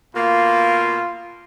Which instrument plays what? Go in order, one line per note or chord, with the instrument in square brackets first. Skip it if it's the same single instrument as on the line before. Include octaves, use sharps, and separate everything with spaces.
[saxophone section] B2 A#3 [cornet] F4